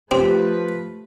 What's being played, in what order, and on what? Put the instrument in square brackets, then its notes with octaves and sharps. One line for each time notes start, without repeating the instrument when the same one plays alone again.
[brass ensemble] F3 B4 [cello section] A3 [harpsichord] C4 [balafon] G4